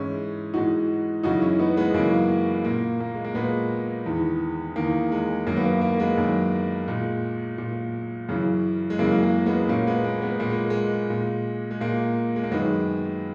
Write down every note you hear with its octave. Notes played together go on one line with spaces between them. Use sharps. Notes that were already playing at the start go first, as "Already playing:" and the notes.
Already playing: G#2 E3 C#4 E4
G#2 E3 D#4 F#4
F#2 C#3 E3 D#4 F#4
C#4 E4
B3 D#4
G#3 B3
F#2 C#3 E3 A#3
A#2 A#3
A#3
G#3
A#3
A#2 G#3 B3
E2 D#3
E2 D#3 A#3
G#3
F#2 D#3 A#3
B3
A#3
A#3
G#3 B3
F#2 D#3
A#2 G#3
A#2
F#2 C#3 E3
G#3
F#2 C#3 E3 A#3
G#3
A#3
G#3 B3
A#2 A#3 C#4
G#3 B3
A#3
G#3 B3
A#2 A#3
G#3
G#3
A#2
G#3
A#2 A#3
G#3
A#3
F#2 D#3 G#3 B3